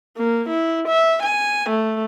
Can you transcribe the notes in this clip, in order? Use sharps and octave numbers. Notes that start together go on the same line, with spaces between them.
A#3
E4
E5
G#5
A3